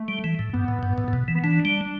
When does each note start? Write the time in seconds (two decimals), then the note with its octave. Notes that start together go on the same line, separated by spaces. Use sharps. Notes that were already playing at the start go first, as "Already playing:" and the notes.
Already playing: A3
0.08 G3
0.24 E3
0.39 A2
0.53 G2 B3
0.68 A2
0.83 G2
0.98 A2
1.08 A2
1.13 B2
1.28 E3
1.35 B3
1.44 E3 D4
1.65 G3